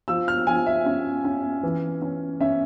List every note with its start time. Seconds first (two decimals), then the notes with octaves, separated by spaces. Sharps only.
0.08 F3 E6
0.28 F6
0.47 F3 G#5
0.66 E5
0.86 C#4
1.24 C#4
1.63 E3
2.02 C#4
2.40 C#4 E5